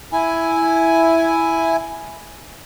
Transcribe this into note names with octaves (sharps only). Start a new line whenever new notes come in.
E4 G#5